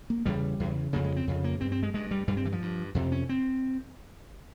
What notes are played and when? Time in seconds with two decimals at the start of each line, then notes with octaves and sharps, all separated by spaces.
0.10 A#3
0.26 E2 C#3 G3
0.60 E2 C#3
0.93 F2 C#3 A#3
1.04 G#3
1.16 C4
1.27 F2 C#3
1.44 A#3
1.61 G2 C4
1.72 C4
1.83 G#3
1.94 G2 G#3
2.11 G3
2.28 G2 G3
2.37 C4
2.45 E3
2.52 F3
2.62 G2
2.95 F2 C3
3.12 C#4
3.29 C4